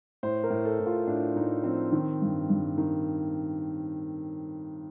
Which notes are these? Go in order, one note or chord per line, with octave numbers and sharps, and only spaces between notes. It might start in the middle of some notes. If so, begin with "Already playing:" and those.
A2 C5
A#4
A2
A4
A2
F4
A2 D4
A2 D#4
F3 C4
D#3
G2
G2
D#3